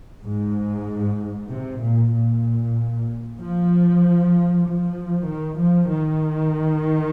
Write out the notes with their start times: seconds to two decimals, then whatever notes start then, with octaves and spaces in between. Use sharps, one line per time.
0.24 G#2
1.50 C3
1.81 A#2
2.13 A#2
3.39 F3
4.64 F3
5.28 D#3
5.59 F3
5.90 D#3